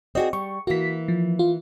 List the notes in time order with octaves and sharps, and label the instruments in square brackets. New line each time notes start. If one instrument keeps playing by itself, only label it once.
[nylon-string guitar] C4 F#4 G#4 [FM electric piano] D5 D#5
[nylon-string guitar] G3 [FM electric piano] C#6
[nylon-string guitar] E3 A#3 [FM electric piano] F#4 B6
[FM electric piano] F3
F4